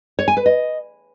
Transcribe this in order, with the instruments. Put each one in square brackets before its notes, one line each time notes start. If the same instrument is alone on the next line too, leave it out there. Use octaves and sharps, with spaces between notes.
[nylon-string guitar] C#5
G#5
B4
D#5